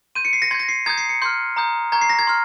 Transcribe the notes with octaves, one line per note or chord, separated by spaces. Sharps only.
C6 G6 D#7
C#7
C7
A#6
C6 G6 G#6
A#6
C7
A#5 D#6 G6 G#6
C7
C#7
C6 F6 G6
A#5 D#6 G6
A#5 C#6 G6 G#6
C7
A#6
G#6
C6 F6